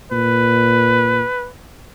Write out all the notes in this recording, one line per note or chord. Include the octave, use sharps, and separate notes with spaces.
A#2 B4